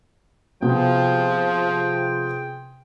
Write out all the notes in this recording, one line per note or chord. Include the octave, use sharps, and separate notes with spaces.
C3 F3 B3 F4 F#4 G#4 G5